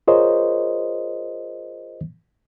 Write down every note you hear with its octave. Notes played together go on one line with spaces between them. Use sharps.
F4 G#4 A#4 C5 C#5 D#5